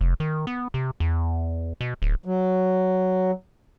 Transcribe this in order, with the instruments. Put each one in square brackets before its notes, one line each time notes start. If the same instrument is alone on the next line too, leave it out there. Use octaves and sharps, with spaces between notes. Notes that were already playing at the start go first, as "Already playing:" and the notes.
[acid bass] F1
D#3
B3
C3
E2
B2
D1
[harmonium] F#3